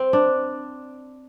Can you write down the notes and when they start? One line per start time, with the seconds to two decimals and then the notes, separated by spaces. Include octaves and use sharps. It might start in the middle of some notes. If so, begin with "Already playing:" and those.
Already playing: C4
0.13 D4